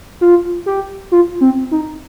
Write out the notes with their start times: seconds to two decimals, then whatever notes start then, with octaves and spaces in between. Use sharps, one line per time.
0.21 F4
0.66 G4
1.12 F4
1.41 C4
1.71 D#4